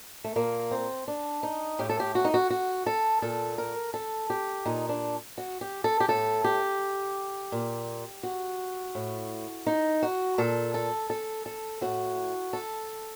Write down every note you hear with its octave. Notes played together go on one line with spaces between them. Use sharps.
A3
A#2 A#3
C4
D4
D#4
A2 G4
A4
G4
F#4
D#4
F#4
F#4
A4
A#2 A4
A#4
A4
G4
A#2 D#4
D4
F#4
G4
A4
G4
A2 A4
G4
A#2
F#4
A2
D#4
F#4
A#2 A4
A4
A4
A4
A2 F#4
A4